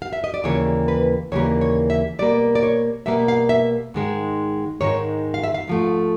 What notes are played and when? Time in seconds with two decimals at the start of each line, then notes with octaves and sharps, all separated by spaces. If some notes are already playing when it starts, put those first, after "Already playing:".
0.02 F5
0.13 E5
0.24 D#5
0.34 D5
0.44 D#2 C#3 E3 G3 A#3 C#5
0.88 B4
1.32 D#2 C#3 E3 G3 A#3 C#5
1.61 C#5
1.90 E5
2.19 B2 G3 A#3 D5
2.55 D5
2.63 C#5
3.06 B2 G3 A#3 E5
3.28 F5
3.49 E5
3.94 G#2 D#3 G#3
4.81 G#2 D#3 G#3 C#5
5.34 F5
5.43 E5
5.54 F5
5.68 G#2 F3 A3